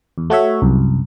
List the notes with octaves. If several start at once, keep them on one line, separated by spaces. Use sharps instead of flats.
E2
A3 F#4 C#5 E5
C2 F#2